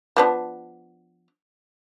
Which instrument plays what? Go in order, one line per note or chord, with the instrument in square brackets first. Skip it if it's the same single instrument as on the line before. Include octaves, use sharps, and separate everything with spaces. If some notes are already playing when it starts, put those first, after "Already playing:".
[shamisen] F3 B3 D4